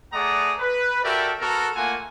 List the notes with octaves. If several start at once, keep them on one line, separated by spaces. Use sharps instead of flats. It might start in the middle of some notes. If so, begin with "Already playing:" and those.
A3 G#4 D5 F#5 A#5 D#6
B4
F#4 G4 A4 A#4 D5 E5
B3 F#4 A4 A#4
A3 A#3 F4 F#5 G#5